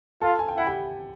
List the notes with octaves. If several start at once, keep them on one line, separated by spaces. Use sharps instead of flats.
F4 A4 A5
G#5
G5
E4 F#5
G4 G5